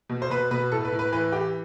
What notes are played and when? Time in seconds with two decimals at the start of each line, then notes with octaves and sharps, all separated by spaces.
0.09 B2
0.22 C5
0.30 B2 B4
0.51 B2 B4
0.72 A2 A4
0.85 B4
0.92 A2
0.99 B4
1.12 E3 B4
1.32 E3 G4